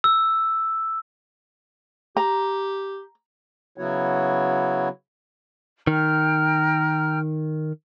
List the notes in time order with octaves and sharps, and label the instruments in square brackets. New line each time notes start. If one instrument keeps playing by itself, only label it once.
[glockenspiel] E6
[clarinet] G4 [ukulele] A#5
[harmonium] C#3 F#3 B3 E4 F#4 C#5
[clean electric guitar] D#3 [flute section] G5 A#5 F6